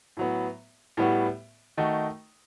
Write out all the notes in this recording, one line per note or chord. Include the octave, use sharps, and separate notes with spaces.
A2 F#3 B3
A2 G3 B3 F#4
D#3 A3 D#4 F#4